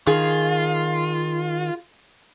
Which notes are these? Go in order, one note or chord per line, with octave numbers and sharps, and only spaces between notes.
D#3 F4 G#4